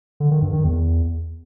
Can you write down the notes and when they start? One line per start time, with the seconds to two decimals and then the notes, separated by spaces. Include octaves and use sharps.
0.20 D3
0.31 D#3
0.42 G2
0.53 D#3
0.64 E2